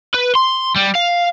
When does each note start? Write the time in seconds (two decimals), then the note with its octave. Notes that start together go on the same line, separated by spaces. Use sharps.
0.14 B4
0.35 C6
0.76 G3
0.95 F5